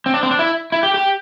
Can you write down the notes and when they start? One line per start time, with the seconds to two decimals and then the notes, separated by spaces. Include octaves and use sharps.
0.06 C4
0.14 D4
0.23 C4
0.31 D4
0.39 E4
0.72 E4
0.83 G4
0.94 G4